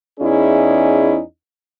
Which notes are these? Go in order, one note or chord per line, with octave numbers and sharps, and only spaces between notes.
E2 C#4 D#4 E4 G#4 D5